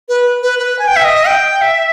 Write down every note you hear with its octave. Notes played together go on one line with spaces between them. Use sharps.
B4
B4
B4
G#5
G5
E5
D#5
G5
E5